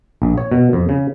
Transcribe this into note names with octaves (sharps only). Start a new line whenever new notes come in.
A#1
C#5
B2
F2
C#3